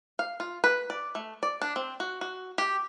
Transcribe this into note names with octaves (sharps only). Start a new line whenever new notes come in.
F5
F4
B4
D5
A3
D5
D4
C4
F#4
F#4
G4